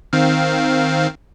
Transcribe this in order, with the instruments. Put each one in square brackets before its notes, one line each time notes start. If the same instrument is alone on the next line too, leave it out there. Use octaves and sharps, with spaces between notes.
[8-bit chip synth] D#3 C4 F5